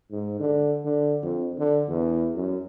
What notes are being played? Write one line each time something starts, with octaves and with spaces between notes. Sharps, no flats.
G#2
D3
D3
F2
D3
E2
F#2